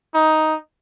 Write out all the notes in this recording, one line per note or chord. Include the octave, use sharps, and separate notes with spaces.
D#4